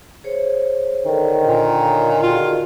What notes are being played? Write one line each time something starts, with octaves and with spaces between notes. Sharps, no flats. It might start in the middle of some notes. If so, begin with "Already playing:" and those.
G#4 C5 C#5
D3 D#3
A#2
C#5 F5 A#5
F4 F#4 G#4